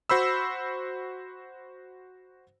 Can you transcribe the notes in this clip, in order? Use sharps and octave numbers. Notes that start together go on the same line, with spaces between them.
F#4 C5 B5 E6